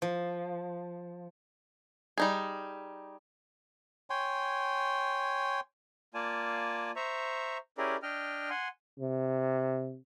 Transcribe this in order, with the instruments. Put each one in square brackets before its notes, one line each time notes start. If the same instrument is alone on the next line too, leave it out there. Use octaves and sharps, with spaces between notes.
[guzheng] F3
[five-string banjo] G3 D#4 G#4
[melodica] C#5 G5 G#5 C6
[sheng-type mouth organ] A#3 F4 D5 G#5 A5
C5 E5 A#5 C#6
C#4 E4 G4 G#4 A#4 D5
D4 D#5 G5 F6
F#5 G#5 C6
[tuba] C3